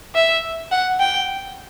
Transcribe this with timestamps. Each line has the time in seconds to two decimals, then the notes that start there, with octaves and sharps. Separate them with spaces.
0.15 E5
0.72 F#5
1.00 G5